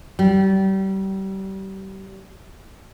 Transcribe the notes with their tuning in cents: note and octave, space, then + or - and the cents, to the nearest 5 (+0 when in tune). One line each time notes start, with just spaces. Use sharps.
G3 -30